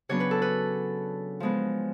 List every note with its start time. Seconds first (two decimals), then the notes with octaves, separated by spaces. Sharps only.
0.09 C#3 F#3 B3 D4 C#5
0.20 B4
0.31 A4
0.42 B4
1.40 F3 G#3 B3